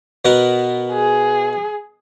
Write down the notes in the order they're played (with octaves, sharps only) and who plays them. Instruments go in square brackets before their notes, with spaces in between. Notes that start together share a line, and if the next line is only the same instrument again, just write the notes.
[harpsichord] B2 B3 A#4
[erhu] G#4